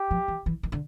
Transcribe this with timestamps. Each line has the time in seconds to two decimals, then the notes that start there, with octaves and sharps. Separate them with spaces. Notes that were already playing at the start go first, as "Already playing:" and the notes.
Already playing: G4
0.11 F3
0.28 E3
0.46 E3
0.63 D#3
0.72 D3